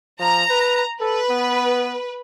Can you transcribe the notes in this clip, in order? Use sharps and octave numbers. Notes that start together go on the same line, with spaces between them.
F3 A#5
B4
A4 B4
B3